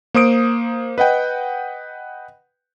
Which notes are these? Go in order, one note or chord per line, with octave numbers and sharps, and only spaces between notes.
A#3 C5 D#6 D7
B4 D#5 F#5 G5